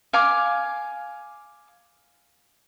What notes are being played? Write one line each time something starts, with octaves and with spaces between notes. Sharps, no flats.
F5 G#5 D6